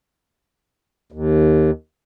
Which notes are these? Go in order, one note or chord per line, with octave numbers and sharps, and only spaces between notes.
D#2